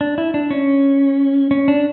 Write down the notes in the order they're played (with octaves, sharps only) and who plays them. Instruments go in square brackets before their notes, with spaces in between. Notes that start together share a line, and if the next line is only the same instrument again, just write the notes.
[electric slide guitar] D4
E4
D4
C#4
C#4
D4